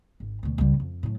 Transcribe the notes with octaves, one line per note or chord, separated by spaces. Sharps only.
G#1
D2 B2
C#2 G3
F2
A2 F#3